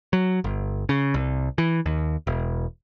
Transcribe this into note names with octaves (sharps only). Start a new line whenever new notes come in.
F#3
G1
C#3
C2
E3
D#2
E1